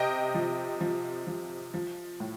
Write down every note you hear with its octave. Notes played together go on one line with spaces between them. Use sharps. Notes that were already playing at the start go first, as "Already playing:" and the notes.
Already playing: C3 D#5 G5
F3
F3
F3
F3
A2